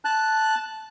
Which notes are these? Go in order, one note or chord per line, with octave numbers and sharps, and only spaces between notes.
A5 F#6